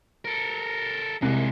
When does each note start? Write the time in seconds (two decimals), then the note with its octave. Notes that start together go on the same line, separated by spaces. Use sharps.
0.25 A4 A#4
1.22 C2 C3 G#3 A#3 F#6